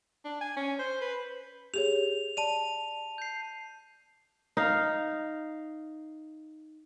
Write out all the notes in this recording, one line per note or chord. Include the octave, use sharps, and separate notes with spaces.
D4
G#5
C#4
C5
B4
G4 G#4 C#5 F7
D5 A5 D#7 F7
G6 C7
D#4 F5